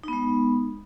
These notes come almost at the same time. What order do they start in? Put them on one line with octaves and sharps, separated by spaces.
D#4 B3 G#3